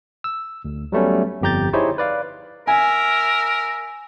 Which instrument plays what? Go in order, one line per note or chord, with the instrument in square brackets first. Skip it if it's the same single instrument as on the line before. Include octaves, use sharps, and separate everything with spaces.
[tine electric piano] E6
D2
F#3 G3 A3 B3 C#4
G1 F2 G4 A#5 G6 A6
D#4 E4 G4 G#4 C5 C#5
B4 D5 F5
[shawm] A#4 [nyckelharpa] E5 [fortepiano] G#5